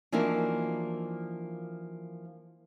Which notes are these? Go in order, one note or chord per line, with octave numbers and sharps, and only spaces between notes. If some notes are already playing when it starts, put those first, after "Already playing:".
E3 F3 A#3 D4 D#4 F#4